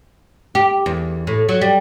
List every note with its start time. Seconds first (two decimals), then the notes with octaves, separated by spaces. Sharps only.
0.55 G4
0.86 E2
1.27 A2
1.49 F#3
1.61 G3